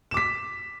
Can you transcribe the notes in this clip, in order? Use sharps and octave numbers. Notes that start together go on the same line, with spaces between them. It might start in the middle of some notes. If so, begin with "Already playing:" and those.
D6 B6 E7